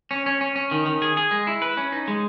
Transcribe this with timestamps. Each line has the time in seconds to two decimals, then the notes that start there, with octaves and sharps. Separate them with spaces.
0.11 C#4
0.26 C#4
0.41 C#4
0.56 C#4
0.71 D#3
0.86 D#3
1.02 G#4
1.17 G#4
1.31 G#3
1.47 E4
1.62 B4
1.77 C#4
1.92 D#4
2.08 G#3